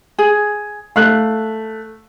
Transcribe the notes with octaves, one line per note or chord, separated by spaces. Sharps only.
G#4
A3 F5 F#6